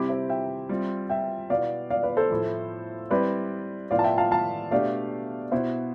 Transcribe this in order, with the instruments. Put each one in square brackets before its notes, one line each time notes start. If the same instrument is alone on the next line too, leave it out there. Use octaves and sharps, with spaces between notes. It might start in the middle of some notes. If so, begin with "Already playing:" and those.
Already playing: [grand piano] C3 G3 C4 E4 G4 [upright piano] B5 D6
[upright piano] C5 E5
E5 G5
[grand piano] G3 C4 F4
[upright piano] E5 G5
[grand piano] B2 B3 E4 [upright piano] D5 F5
[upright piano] D5 F5
B4 D5
A4 C5
[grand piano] A2 F3 A3 E4
[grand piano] G3 C4 E4 G4 [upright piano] B4 D5
[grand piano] A2 F3 B3 F4 [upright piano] D5 F5
[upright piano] A5
E5 G5
F5 A5
F5 A5
[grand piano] B2 A3 D4 G4 [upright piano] D5 F5
[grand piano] B2 B3 E4 [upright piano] C5 E5